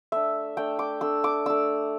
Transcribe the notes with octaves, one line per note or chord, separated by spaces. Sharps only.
A3 D4 E5
A3 D4 G5
D6
A3 D4 E6
D6
A3 D4 E6